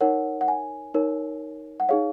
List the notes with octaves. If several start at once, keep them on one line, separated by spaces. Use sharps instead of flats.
D#4 A#4 C#5 F#5
F#5
G#5
D#4 A#4 C#5
F#5
D#4 G#4 C#5 F5